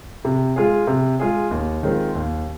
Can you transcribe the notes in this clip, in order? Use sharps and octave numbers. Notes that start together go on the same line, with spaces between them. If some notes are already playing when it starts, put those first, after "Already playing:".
C3
G#3 F4 G#4
C3
G#3 F4 G#4
D#2
D#3 G#3 C4 F4
D#2